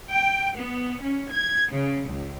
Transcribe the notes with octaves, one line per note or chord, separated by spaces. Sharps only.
G5
B3
C#4
G#6
C#3
C#2